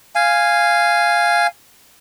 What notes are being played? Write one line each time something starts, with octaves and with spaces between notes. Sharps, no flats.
F5 G#5